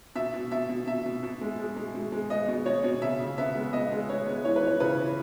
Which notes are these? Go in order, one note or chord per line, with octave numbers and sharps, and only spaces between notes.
B2 E5
B2
B2 E5
B2
B2 E5
B2
B2
G#3
G#3
G#3
B2
G#3
B3 D#5
B2
B2 C#5
B2
C#3 E5
C#3
B3 E5
G#3
B3 D#5
G#3
B3 C#5
G#3
E3 C#5
B4
E3 C#5
C#3 B4
E3